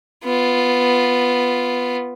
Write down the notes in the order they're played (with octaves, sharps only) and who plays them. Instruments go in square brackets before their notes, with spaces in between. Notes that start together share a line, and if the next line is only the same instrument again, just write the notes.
[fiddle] B3 F4